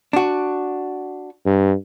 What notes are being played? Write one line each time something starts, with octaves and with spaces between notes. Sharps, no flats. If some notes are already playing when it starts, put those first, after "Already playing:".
D4 F#4
G2